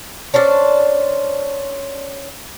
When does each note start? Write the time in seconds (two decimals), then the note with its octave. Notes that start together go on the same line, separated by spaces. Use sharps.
0.34 C#4 D4 C5 D5